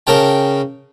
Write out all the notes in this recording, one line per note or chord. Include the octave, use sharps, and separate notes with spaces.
C#3 A#4 G5 A5